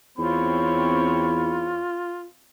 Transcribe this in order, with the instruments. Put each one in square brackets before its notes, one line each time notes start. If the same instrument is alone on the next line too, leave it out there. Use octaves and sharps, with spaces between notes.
[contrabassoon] E2 [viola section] C4 C#5 [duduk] F4 [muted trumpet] B5